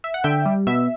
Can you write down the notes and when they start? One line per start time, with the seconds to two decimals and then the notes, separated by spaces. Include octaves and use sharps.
0.04 E5
0.14 F#5
0.24 D3 E5 G5
0.46 G3
0.67 B2 E5